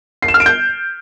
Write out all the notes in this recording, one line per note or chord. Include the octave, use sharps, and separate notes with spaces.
C7
E7
F6
D7
G6